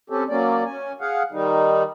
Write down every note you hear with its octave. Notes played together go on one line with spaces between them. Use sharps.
C4 C#4 G4 A4
F#3 A#3 C#4 D5
C#4 G#5
G#4 F5 F#5
D#3 G3 D#4